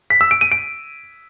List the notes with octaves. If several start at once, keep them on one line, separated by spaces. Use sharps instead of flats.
B6
E6
D7
D#7
D7